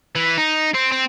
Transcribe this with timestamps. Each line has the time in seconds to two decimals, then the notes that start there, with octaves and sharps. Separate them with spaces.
0.16 E3
0.38 D#4
0.74 C4
0.92 C4